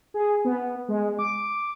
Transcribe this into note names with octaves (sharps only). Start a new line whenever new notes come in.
G#4
B3
G#3
D6